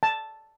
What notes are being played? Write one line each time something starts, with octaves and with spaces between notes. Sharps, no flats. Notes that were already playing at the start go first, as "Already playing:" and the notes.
A5